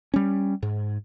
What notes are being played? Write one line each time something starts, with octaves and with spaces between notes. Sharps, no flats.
G3 C#4
G#2